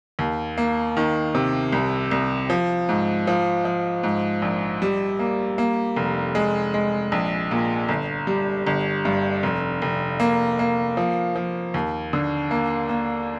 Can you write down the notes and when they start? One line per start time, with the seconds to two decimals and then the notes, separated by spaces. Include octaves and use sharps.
0.19 D#2
0.58 A#3
0.97 D#3
1.35 C3
1.73 C2
2.11 C2
2.50 F3
2.89 G#2
3.27 F3
3.65 F3
4.04 G#2
4.42 A#1
4.82 G3
5.19 A#3
5.58 A#3
5.96 F1
6.35 G#3
6.74 G#3
7.12 A#1
7.51 A#2
7.89 G1
8.27 G3
8.67 G1
9.05 G2
9.43 F1
9.82 F1
10.20 A#3
10.59 A#3
10.97 F3
11.36 F3
11.74 D#2
12.13 D3
12.51 A#3
12.89 A#3